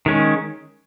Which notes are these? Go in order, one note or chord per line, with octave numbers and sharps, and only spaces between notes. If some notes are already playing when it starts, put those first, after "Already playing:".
D#3 G#3 C#4